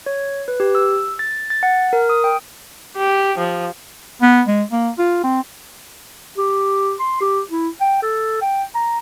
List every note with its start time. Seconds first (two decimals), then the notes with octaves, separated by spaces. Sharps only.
0.06 C#5
0.48 B4
0.60 G4
0.75 E6
1.19 A6
1.50 A6
1.63 F#5
1.93 A#4
2.09 D#6
2.24 G5
2.97 G4
3.38 F3
4.22 B3
4.47 G#3
4.72 A#3
4.98 F4
5.23 C4
6.38 G4
7.00 C6
7.21 G4
7.50 E4
7.81 G5
8.03 A4
8.42 G5
8.75 A#5